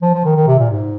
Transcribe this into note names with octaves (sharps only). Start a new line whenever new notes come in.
F3
F3
D#3
D#3
C3
A#2
G#2